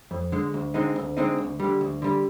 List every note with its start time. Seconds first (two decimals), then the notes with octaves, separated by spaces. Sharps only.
0.11 F2
0.32 D3 G#3
0.54 D2
0.74 D3 G#3 C4 D#4
0.96 D2
1.17 D3 G#3 C4 D#4
1.38 D2
1.60 D3 G3
1.81 D2
2.02 D3 G3